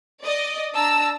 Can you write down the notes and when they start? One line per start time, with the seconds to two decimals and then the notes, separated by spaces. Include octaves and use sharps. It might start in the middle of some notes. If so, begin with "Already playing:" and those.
0.23 D5 D#5
0.75 D4 A5 A#5 E6